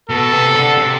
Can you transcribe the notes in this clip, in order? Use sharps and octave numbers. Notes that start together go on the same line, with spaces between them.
B2 A4
C3
D3
C3